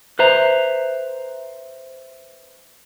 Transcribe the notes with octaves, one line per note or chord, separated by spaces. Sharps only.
B4 C5 E5 A#5